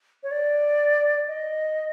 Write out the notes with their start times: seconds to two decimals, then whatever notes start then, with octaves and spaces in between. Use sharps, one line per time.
0.23 C#5
0.31 D5
1.28 D#5